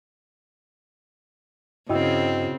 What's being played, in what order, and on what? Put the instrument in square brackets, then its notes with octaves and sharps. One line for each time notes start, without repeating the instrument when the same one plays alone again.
[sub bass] G2 [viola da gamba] C#3 C4 [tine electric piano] E4 F#4 [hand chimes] D#5 G5 E6